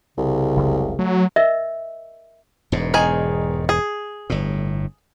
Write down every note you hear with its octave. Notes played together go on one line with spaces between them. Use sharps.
C2 C#3
F#1 C#2
F#3 A3
A#4 D#5 E5 E6
E1 G#2 B2
D#3 G#4 G#5
G#4
G1 A2